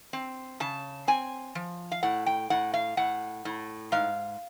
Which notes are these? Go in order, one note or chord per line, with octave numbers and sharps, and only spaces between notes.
C4
C#3 A5
C4 G#5
F3
F5
A2 F#5
G5
A2 F#5
F5
A2 F#5
A2
G#2 F5